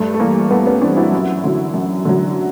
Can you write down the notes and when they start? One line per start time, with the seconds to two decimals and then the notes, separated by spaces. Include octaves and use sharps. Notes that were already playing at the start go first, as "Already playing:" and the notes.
Already playing: G2 A3
0.14 A3
0.20 E3 A#3
0.51 G2 A3 B3
0.66 B3 C#4
0.82 E3 C4 D4
0.97 E4 F#4
1.12 F#2
1.44 D3 F#3
1.74 F#2
2.05 D3 F#3